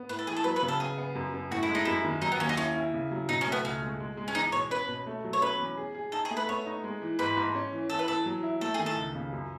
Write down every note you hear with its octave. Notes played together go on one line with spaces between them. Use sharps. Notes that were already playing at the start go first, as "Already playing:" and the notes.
Already playing: B3
A2 B4
A4
E3 G#4
A4
F#3 B4
B4
C#3
A4
B3 G#4
B3
F#2
F#2
A2 F#4
E4
G#3
D#4
F#2 E4
D#3
F#3 D#4
B3
D#2 C#4
D#4
C#4 E4
E4
C#3
F#3
B2 D#4
C#4
A3
B3
C#2 C#4
G#3
G#3
G#3
C#4
E2 D#4
B2 C#5
C#4 B4
B2
A3
F#3
C#5
C#4 B4
E2
G#4
G#4
D#4 A4
G#4
A3
B4
B3 C#5
D#4
G#3
E3
G#2 B4
G#2
C#4
E3
E3 A4
B4
E3 A4
F#3
E4
A3 A4
D#3 G#4
A4
C#2
C#3
F#2